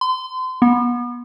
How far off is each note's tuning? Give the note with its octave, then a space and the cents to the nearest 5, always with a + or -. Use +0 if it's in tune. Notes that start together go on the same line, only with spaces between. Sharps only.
C6 -35
B3 -30